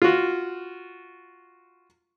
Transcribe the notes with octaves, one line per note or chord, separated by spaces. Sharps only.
F4 F#4